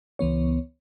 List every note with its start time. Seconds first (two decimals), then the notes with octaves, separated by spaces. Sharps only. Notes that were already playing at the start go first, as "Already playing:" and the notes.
0.19 C#2 E3 B3 C#5